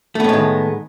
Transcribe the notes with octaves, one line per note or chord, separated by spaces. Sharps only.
A2 D#3 G#3 A3 B3